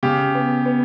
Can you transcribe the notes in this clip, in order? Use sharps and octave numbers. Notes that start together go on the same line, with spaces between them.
C#3 G4
B3
B3